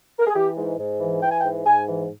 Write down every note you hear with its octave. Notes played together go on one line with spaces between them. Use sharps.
A#4
G#4
E3 G4
G#2
G#2
E3
E3 G5
G#5
G5
G#2
G#2 G#5
E3